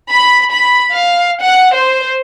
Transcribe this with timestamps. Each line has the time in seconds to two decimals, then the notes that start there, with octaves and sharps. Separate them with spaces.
0.11 B5
0.52 B5
0.92 F5
1.41 F#5
1.74 C5